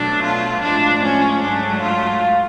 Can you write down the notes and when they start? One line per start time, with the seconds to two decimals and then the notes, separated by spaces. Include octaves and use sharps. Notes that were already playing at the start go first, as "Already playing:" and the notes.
Already playing: B2 F#3 A3 D4
0.23 F4
0.62 A2 F3 G#3 D4
1.02 C#4
1.41 G#2 F#3 A3 D4
1.81 F4